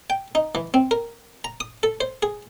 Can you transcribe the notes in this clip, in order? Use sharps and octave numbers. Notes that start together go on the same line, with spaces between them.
G5
D#4
E3
C4
A#4
A#5
D#6
A4
C5
G#4